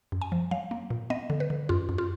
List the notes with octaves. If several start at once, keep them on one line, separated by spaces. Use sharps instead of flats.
F#2
G#5
F3
F#3 F5
A#3
A#2
B3 D#5
D3
B4
D3
F#2 F4
F#2
F4